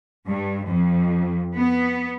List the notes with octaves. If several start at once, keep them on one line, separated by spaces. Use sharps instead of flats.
G2
F2
B3